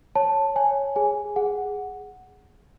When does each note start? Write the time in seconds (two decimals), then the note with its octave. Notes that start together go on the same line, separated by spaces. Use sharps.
0.15 C#5 A5
0.56 C#5 G#5
0.96 G#4 G#5
1.36 G#4 F#5